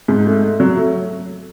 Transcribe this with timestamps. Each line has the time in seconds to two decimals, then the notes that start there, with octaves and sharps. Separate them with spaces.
0.08 G#2
0.26 A3
0.43 A3
0.60 F#3
0.77 A3